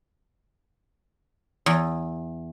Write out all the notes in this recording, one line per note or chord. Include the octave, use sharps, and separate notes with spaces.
E2